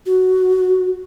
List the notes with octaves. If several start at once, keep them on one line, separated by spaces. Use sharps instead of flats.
F#4